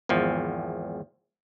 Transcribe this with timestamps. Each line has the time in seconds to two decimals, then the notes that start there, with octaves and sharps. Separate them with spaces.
0.09 G#1 E2 F3